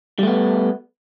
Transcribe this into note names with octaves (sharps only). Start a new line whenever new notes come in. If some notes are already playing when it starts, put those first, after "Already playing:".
G3 A3 B3